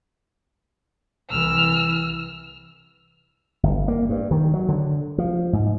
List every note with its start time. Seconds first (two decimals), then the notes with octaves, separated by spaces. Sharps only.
1.30 C2 E3 E6 F6
3.63 G1
3.88 A#3
4.09 G2
4.31 D#3
4.54 F#3
4.69 D3
5.18 F3
5.53 G#2